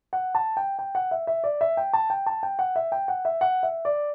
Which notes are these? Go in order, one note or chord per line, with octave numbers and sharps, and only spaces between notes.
F#5
A5
G5
G5
F#5
E5
E5
D5
E5
G5
A5
G5
A5
G5
F#5
E5
G5
F#5
E5
F#5
E5
D5